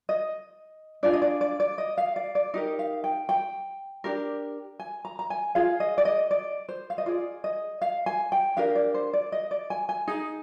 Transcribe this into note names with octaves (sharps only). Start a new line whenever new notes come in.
D#5
D4 F4 G#4 D5
D#5
D5
D5
D5
D#5
F5
D5
D5
D#4 G4 A#4 D#5
F5
G5
G5
D4 G4 A#4
G#5
A#5
A#5
G#5
F4 G#4 F5
D#5
D5
D#5
D5
C5
F5
D#5
F4 G#4 D5
D#5
F5
G#5
G5
D4 G4 A#4 F5
D5
C5
D5
D#5
D5
G#5
G#5
D#4 G#4